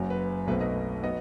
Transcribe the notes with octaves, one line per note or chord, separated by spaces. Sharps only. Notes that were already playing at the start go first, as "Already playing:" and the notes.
Already playing: F#1 F#2 F#3
B4
B1 B2 A3 C4 B4
B4 D#5
F#3 B3 D#5 F#5